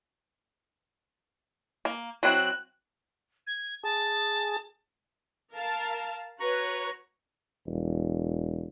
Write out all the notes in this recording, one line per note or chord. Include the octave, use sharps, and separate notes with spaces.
A#3
F#3 C4 E4 F#6
G#6
G#4 A5
A#4 F5 A5
F#4 B4 C#5 A#5 C#6
E1